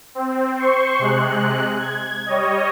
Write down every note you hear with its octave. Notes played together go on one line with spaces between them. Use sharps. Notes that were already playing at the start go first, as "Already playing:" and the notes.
C4
C5 C6 C#6
C3 G#3 F#6
G#6
G3 C#5 D#5